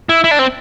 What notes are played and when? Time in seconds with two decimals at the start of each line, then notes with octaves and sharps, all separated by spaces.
0.09 E4
0.24 E4
0.31 D4
0.39 C4